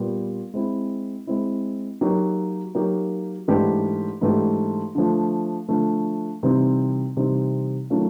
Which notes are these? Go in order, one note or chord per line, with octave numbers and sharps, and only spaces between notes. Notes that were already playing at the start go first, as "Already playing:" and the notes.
Already playing: A#2 G3 B3
G#3 C4 E4
G#3 C4 E4
F#3 A#3 D#4 G4
F#3 A#3 D#4 G4
G#2 E3 A3 D4 G4
G#2 E3 A3 D4 G4
D3 F3 A3
D3 F3 A3
C3 E3 G3 C4 D#4
C3 E3 G3 C4 D#4
D#3 F#3 A3 C#4 F4